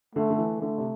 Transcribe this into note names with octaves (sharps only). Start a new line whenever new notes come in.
D3 A3
D3
E3
D3 A3
C3